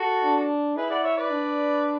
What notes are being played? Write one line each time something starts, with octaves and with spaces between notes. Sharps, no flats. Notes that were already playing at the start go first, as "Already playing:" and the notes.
Already playing: F#4 A4
D4
E4 G#4 B4
D5 F#5
C#5 E5
B4 D5
D4